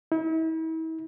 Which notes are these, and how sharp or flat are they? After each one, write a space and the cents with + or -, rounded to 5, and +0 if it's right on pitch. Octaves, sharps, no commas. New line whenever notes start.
E4 -40